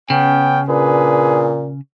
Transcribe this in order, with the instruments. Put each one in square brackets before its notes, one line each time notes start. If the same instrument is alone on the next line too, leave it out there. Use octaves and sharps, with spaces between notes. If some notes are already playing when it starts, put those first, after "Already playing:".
[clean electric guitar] C#3 [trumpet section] B3 C#4 G5
[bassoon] A#2 [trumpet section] D4 G#4 B4